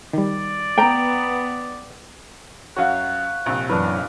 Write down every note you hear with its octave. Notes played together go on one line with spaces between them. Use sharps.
D#3 G3 D5
B3 G5 A#5
F#2 F#4 C#5 F5 F#5 F#6
A#1 C3
F#2 E3 F#3 D4 B4 F6